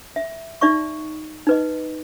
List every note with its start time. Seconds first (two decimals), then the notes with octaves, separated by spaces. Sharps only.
0.16 E5
0.61 D#4 D5 E5 C#6
1.47 D#4 B4 D#5